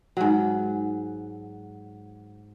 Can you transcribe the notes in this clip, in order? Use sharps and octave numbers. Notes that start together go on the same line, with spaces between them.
G#2 F#3